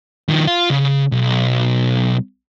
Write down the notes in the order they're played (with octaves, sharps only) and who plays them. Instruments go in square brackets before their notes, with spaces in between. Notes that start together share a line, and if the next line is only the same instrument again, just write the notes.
[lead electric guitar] D#3 F3
F4 F5
C#3
B1